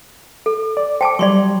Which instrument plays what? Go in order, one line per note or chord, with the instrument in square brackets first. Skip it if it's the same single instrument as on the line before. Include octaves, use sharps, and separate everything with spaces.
[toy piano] A4
[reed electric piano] D5
[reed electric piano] C5 D6 [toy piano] G5 A5
[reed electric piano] F#3 G3 [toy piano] D5 C6 C#6